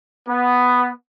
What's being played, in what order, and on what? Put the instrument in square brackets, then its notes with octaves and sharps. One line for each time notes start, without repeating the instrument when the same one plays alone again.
[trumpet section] B3